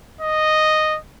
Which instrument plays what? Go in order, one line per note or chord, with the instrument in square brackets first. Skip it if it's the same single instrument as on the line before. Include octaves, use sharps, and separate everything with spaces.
[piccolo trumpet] D#5